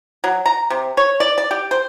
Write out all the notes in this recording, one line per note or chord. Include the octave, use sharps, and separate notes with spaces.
F#3
A#5
C3
C#5
D5
D5
G4
C5